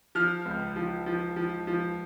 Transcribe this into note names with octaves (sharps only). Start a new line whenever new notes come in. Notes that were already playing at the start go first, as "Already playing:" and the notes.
F3 F6
C#2
F3
F3
F3
F3